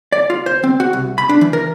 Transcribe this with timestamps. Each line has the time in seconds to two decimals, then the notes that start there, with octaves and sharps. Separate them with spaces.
0.12 D5
0.30 F4
0.46 C5
0.63 C4
0.80 F#4
0.93 C2
1.18 B5
1.29 D4
1.41 E3
1.53 A#4